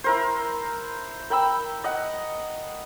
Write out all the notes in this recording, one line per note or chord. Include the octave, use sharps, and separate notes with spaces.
E4 A#4 C5
A#4 G5 B5 E6
D#5 F#5